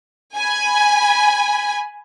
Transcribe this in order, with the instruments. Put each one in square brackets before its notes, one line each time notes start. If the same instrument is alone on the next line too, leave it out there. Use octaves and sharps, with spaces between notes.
[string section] G#5 B5